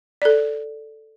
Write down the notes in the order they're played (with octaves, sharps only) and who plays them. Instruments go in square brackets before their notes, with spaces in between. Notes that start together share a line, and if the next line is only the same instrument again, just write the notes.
[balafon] A4 D5